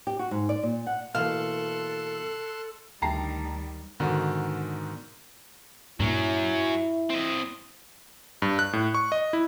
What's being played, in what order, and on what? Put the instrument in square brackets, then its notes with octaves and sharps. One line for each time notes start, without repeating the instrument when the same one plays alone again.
[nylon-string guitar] G4
F#4
G#2
D5
A#2
F#5
[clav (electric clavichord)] B2 E3 A#3 [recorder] A4 [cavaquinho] F5 [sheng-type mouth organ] A5 C6 F#6
[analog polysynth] D2 [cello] D#3 G3 [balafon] G5 [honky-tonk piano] A5 A#5 C7
[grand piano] G#2 B2 D3 D#3
[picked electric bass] G2 A#2 [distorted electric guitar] F#3 C#4 [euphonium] E4
[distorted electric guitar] C4 D#5
[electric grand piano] G2
F#6
A2
C#6
D#5
E4